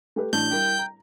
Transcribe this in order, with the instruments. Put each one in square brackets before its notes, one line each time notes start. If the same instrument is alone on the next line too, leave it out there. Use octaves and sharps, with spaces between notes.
[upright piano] A3 G4 B4
[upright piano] A1 D4 A5 [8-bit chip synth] G6
[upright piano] G3 E4 A#4 [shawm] G5
[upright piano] A#5